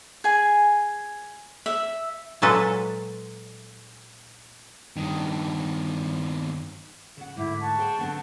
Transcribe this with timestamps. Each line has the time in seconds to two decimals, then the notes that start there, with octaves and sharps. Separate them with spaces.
0.24 G#4 G#5
1.66 E5
2.42 A#2 F#3 G#3 A4 B4
4.96 G2 D#3
7.17 C#3 F#5
7.37 D2 G#2 E4 D6
7.61 F#5 A5 C#6
7.78 G#4 C5 G5
7.98 D3 B3 C4